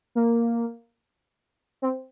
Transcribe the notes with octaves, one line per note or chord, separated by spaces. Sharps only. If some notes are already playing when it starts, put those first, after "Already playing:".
A#3
C4